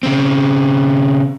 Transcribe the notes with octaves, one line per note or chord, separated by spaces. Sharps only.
C#3 C4